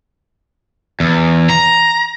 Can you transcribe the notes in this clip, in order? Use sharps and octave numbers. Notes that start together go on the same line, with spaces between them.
E2
A#5